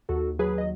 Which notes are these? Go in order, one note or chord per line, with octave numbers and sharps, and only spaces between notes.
D#2 F#4 A4
F#3 G#4 B4
D#5